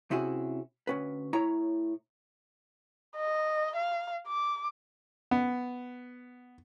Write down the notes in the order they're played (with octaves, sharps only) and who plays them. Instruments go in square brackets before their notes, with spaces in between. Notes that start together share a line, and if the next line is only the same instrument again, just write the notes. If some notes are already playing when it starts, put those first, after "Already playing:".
[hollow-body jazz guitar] C3 C4 C#4 E4 F#4 G#4
D2 C#4 B4
A2 E4 C#5 A#5
[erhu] D#5
F5
D6
[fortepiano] B3